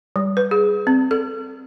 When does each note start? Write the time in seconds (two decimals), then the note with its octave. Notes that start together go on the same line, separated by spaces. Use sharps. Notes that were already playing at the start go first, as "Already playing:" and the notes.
0.16 G3
0.37 B4
0.51 G#4
0.87 C4
1.11 A4